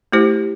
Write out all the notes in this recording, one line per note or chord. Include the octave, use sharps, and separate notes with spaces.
A3 E4 G4 C5